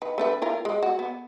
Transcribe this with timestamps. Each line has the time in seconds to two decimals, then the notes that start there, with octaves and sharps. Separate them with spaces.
0.02 D#3 B4
0.18 A3 D4 B4
0.42 E4 F4 A#4
0.65 G#3
0.83 F#4
0.99 B3